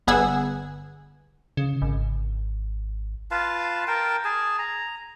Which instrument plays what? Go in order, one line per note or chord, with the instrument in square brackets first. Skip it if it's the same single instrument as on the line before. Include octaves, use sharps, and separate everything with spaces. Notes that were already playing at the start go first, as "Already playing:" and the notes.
[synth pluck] G1 B3 G#4 F#5 G#5 E6
[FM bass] C#3
G#1
[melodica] F4 B4 F5 A5
A#4 G5 A5
G#4 G#5 A5
A#5